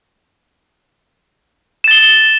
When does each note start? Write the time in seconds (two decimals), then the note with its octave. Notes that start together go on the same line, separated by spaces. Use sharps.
1.84 E7
1.88 A6
1.91 G7